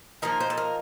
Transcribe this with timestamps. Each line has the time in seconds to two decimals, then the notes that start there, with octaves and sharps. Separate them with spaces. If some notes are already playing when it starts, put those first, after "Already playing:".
0.22 F3 A#3 D#4 A#4
0.40 C5
0.50 A4
0.57 A#4